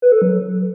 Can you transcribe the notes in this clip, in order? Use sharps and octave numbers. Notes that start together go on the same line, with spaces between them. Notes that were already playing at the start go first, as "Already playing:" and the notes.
B4
A4
F#3